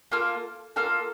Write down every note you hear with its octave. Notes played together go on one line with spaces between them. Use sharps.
A#3 F4 A4 F6
A#3 F4 A4 F6